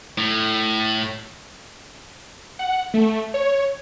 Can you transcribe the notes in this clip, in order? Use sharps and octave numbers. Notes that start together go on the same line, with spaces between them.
A2
F#5
A3
C#5